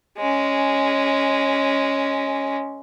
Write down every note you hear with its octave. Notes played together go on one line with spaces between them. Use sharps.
G#3 C#4